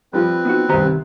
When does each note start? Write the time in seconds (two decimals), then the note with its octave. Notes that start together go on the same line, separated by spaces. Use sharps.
0.13 F3 G3 C4 B4
0.45 B3 D#4 F#4
0.69 C2 D#3 G4 C5 A#5
0.83 C3